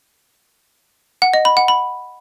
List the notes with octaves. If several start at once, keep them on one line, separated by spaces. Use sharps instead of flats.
F#5
D#5
B5
F#5
B5